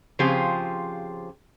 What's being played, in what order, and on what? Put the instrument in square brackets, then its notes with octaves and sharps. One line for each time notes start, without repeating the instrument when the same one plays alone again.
[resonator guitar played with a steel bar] C#3 F3 C4 F4 G4 G#4